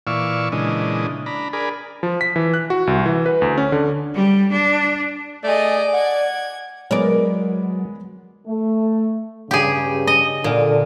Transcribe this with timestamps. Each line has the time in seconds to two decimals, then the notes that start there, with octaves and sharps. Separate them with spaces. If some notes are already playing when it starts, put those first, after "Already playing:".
0.07 A#2 E3 D5 F5 C#6 E6
0.52 A#2 C#3 E3 G#3 D4 D#5
1.26 D4 A#5 B5
1.53 G#4 A#4 D5 B5
2.03 F3
2.21 B6
2.36 E3
2.54 F#6
2.70 F#4
2.87 C2
3.06 E3
3.26 B4
3.42 D2
3.58 C#4
3.72 D3
4.14 G3
4.52 D4
5.44 A3 G#4 D5 D#5
5.94 F#5 G#6
6.91 F#3 G#3 B3 G#4 A#4 D5
8.46 A3
9.51 G2 C#3 G4 G#4
10.07 D#5
10.44 A#2 D3